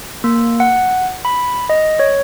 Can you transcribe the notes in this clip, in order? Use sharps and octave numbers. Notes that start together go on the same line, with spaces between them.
A#3
F#5
B5
D#5
C#5